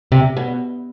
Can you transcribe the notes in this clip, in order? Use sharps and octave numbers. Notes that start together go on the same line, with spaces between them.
C3
B2